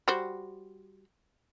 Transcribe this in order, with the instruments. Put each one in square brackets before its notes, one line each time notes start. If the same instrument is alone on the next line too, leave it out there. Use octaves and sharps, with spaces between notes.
[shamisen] G3 F#4 C5